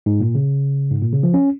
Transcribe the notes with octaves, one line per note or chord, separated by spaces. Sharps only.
G#2
A#2
C#3
G#2
A#2
C#3
F3
C#4